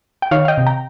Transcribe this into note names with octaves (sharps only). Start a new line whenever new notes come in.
G5
D#3 C#5 F5
F5
D#5 G5
C3
G5 A#5